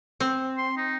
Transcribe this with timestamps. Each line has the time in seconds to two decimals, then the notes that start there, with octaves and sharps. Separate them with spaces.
0.20 C4
0.58 C6
0.77 D#4